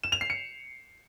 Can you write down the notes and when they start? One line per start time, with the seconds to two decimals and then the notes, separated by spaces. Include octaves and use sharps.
0.03 E7
0.12 F7
0.21 C7
0.30 C#7